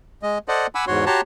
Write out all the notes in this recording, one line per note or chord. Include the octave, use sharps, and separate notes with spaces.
G#3 D#5
A4 C5 D5 D#5 F#5
F#5 G#5 B5 D6 E6
E2 G#2 F#4 C#5 C6
F#4 G4 C#5 A5 A#5 C6